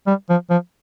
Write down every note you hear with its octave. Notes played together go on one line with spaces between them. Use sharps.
G3
F3
F3